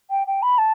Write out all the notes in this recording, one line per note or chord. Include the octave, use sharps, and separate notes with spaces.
G5
G5
B5
A5